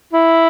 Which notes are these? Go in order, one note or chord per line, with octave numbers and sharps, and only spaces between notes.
E4